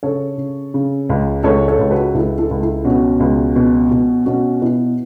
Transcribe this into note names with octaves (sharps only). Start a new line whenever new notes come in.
C#3 A4 C#5
C#3
C#3
C#2
C#2 A4 C#5
A4 C#5
C#2
F#4 B4
C#2 E4 A4
E4 A4
C#2
E4 A4
B2 C#4 F#4
C#2
B2
B2
B2 C#4 F#4
B2 E4